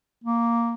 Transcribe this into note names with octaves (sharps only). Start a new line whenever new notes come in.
A#3